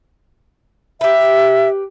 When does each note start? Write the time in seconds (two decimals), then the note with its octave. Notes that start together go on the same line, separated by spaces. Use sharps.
1.01 G4 B4 E5